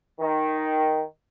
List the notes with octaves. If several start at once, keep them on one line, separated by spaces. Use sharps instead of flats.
D#3